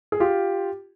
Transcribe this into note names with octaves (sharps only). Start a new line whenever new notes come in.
G#4
F4 G4